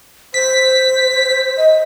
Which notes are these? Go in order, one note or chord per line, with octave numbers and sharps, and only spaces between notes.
C5 B6
D#5